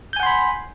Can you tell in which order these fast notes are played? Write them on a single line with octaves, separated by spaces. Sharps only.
G6 G#5 F#5 C6 B5